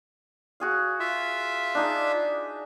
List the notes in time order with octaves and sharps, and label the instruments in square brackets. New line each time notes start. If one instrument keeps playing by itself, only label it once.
[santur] F#4 G#4 F5
[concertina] F4 E5
[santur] D4 D#4 G#4